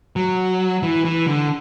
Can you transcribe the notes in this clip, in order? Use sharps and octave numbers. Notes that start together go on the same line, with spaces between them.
F#3
E3
E3
D3